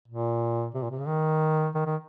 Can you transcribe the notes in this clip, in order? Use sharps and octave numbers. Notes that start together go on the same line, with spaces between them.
A#2
C3
A#2
C3
C#3
D#3
D#3
D#3